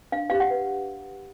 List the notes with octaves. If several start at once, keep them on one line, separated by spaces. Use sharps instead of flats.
D4 F5
G4 F5
F#5
B4